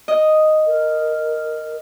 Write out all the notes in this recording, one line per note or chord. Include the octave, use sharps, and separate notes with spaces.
D#5
A#4